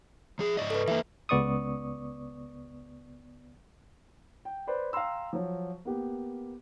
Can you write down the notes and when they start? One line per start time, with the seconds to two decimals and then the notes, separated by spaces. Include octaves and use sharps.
0.39 F3 G#4
0.57 G#2 D5 D#5
0.70 A4 B4
0.88 E3 A#3 E5
1.29 C#2 B3 D5 C#6 D#6
4.45 G5
4.67 B4 C5 D5 B5
4.93 F5 G5 A#5 C6 E6
5.33 F3 F#3
5.85 A#3 B3 G4